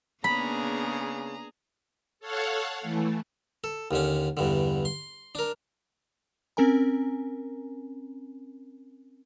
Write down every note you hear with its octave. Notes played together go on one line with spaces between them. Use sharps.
C#3 A#3 B3 D4 G#4 A#5 B5
A4 C#5 F5 F#5
E3 A3
A4
D#2 D3 C#4
E2 G2 D3
C6
D4 A#4
C4 C#4 A#4 G#5 A#5